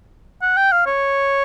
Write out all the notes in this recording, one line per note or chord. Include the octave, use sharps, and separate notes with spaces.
F#5
G5
F5
C#5